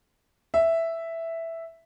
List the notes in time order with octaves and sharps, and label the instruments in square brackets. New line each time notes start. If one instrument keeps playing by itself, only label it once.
[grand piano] E5